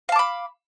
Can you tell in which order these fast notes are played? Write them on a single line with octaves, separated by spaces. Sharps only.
F5 A5 D6 B5